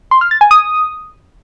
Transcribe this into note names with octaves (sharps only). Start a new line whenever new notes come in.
C6
F6
A6
G#5
D#6